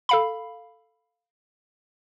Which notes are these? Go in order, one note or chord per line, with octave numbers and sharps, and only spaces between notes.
A4 F5 B5